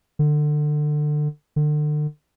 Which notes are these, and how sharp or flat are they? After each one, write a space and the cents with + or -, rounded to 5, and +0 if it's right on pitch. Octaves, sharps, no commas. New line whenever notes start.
D3 +25
D3 +35